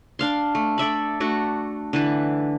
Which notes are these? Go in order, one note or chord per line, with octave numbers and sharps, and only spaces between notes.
D4 F5 C6
A3
A4 D5 E5 B5
A3 D4 F#4
D3 E3 B4